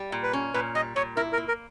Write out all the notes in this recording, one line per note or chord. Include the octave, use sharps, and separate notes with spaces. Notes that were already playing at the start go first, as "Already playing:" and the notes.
Already playing: G3
A#2
B4
C#4
A#2 B4
G3 D#5
A#2 C#5
E4 A#4
A#4
A#3
A#4